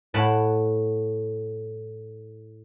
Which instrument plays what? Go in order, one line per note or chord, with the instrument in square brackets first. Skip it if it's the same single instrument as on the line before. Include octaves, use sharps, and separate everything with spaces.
[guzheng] A2 F#5 A5 B5